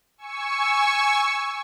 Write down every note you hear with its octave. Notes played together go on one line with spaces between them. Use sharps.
G#5 C#6 E6 C#7